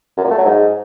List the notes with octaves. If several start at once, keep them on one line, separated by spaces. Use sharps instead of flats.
F#2
A#2
A3
F#3
G#2